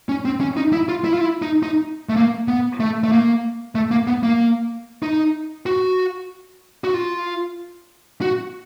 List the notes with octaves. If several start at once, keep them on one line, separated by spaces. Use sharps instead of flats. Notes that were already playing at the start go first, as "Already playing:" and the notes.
C#4
C4
C#4
D#4
E4
F4
E4
F4
E4
D#4
D#4
A3
A#3
B3
A3
A3
A#3
A3
A#3
B3
A#3
D#4
F#4
F#4
F4
F#4